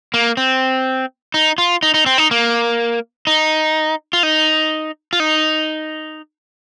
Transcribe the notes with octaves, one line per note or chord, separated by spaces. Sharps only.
A#3
C4
D#4
F4
D#4
D#4
C4
D#4
A#3
D#4
F4
D#4
F4
D#4